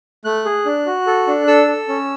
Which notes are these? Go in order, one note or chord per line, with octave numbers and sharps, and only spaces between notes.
A3 F#6
G#4
D4
F#4
A4
D4
A4 E6
A4
C#4